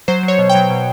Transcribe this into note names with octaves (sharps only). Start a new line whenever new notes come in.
F#3 C5
F#3
C#5
B2
G5
F#3
B2